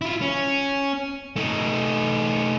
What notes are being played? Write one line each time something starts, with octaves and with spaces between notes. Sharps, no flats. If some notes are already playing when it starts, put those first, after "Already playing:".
E4 F4
C#4
A3 D#4